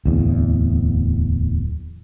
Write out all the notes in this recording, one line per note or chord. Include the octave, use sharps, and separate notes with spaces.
D1 E2